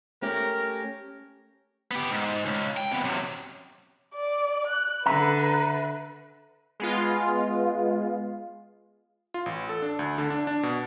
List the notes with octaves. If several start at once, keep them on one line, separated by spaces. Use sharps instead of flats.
A3 C#4 G4 A#4
B3 G4
G#2
C#2
G5
C3 B3
F#2 C3
D5
F#6
D3 B4 E5 A#5
G#3 B3 F4
F4
A1
A4
D4
D2
D3
D4
D4
B2